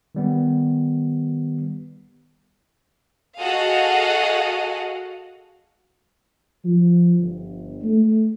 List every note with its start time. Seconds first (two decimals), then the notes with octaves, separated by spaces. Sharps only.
0.15 D#3 G3 B3
3.41 F#4 G#4 A4 D#5 F5 F#5
6.65 F3
7.19 G1
7.82 A3